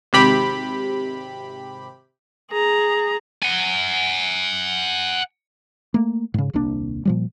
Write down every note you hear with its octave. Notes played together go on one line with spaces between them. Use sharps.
G#1 C3 G4 B5
G#4 A#5
F#5 G#5
A3 A#3
G#2 C#3
D#1 C2 A#3 D4
A#2 F3 G3